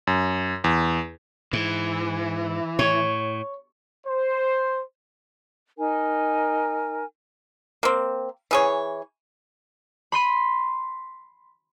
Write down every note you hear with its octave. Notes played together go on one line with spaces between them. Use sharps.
F#2
E2
G#2 E3
A2 C#5
C5
D#4 A#4 G#5
A#3 C4
E3 G#4 C#5
B5 C6 D#7